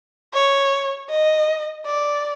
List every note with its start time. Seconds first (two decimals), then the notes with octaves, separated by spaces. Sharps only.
0.34 C#5
1.10 D#5
1.86 D5